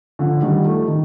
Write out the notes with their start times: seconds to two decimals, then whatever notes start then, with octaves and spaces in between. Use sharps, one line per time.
0.19 D3 F3
0.42 D#3 G3
0.65 F3 A3
0.88 D#3